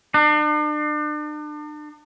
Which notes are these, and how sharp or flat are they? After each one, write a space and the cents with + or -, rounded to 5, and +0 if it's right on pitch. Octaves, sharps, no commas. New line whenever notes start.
D4 +40